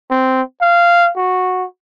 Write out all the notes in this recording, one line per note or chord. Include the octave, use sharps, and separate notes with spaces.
C4
F5
F#4